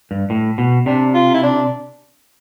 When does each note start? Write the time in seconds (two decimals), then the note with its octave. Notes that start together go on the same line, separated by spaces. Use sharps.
0.11 G2
0.30 A2
0.58 B2
0.86 C3 D4
1.14 F4
1.34 E4
1.43 D4